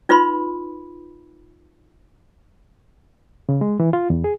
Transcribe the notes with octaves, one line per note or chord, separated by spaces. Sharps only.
D#4 F4 B4 B5 C6
C#3
G#3
E3
F4
E2
G#4